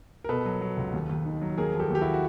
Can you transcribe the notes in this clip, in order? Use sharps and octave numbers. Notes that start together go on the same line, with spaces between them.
A#4
B2 A4 B4
F#3
F#3
C#2
D#2
D#2
D#3
F#3
D#2 G#4 A#4
F3
G4 A4
D#2 G4
E4 F#4
F#4